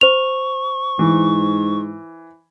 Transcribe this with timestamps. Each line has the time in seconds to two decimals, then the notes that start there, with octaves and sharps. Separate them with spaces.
0.01 C5 C#6 F7
0.99 G#2 E3